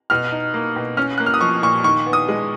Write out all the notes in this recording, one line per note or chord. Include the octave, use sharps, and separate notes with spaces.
B2 F6
D#4
A#3
B2
C#4 F6
A#3 F#6
F6
D#6
F3 C#6
A#2 C#6
D#3 C#6
B3
D#6
G#3